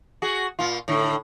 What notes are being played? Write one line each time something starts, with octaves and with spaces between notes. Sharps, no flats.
F#4 G#4
A#2 F4
A2 D3